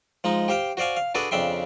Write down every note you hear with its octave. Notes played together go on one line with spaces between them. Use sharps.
F3 G#3 D#4
G4 C5 F5 G5
F#4 C5 D5 F5 G#5
F5
D4 F#4 G#4 A4 B4 D5
F2 C#3 D4 E5 G5 C6